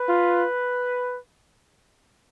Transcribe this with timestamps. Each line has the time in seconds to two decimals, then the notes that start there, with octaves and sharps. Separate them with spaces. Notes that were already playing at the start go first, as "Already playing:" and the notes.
Already playing: B4
0.08 F4